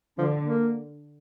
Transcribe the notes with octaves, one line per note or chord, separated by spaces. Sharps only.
D3 F3
A#3